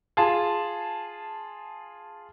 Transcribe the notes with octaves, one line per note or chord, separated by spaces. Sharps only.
F4 G#4 A5